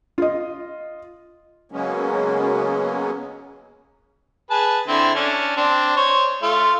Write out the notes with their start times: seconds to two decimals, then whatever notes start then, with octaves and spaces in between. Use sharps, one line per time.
0.18 F4 D#5
1.72 C#3 F#3 G#3 A#3 B3 C#4
4.51 G#4 B4 A5
4.88 D3 C4 E4
5.15 C#4 D4
5.57 C4 D4
5.96 C5 C#5
6.43 A3 F4